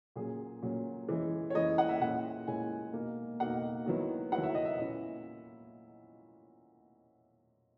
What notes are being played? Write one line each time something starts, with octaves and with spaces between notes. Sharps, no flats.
A#2 F#3 C#4 G#4
A#2 F#3 C#4
E3 G#3 C#4 E4
C#5
E3 G#3 C#4 E4 D#5
F#5
E5
A#2 G#3 C#4 E4 F#5
A#2 G#3 C#4 E4 G#5
B2 A#3 D#4
B2 A#3 D#4 F#5
D#3 F#3 B3 E4
D#3 F#3 B3 E4 F#5
E5
D#5
E5
A#2 A#3 C#4 E4